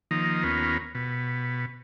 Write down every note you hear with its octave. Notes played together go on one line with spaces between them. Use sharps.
D#3 F3 A#3 D#4
D#2 B3 C#4 F4 A#4
B2